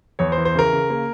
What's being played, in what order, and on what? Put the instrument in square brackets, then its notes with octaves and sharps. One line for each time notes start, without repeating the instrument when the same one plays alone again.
[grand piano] E2 C#5
C5
E3
C5
C#3 A#4
C#3
A#3